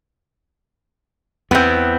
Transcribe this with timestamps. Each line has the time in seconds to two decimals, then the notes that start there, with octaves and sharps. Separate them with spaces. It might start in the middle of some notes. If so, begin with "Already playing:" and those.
1.51 E2 B3 C4